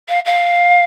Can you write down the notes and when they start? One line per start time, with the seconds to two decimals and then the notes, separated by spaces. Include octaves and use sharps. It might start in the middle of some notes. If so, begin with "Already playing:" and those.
0.08 F5
0.25 F5